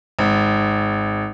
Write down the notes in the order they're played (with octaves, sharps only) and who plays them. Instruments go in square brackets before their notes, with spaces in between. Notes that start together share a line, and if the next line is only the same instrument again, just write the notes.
[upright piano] G#1